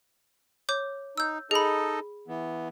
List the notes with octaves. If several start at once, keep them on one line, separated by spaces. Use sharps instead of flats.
C#5 D6 G6
D#4 E6 G6
D#4 G#4 A4 D#5 B5
E3 B3